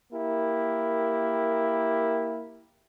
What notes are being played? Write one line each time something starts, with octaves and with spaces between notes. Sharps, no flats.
A#3 E4 G4 A#4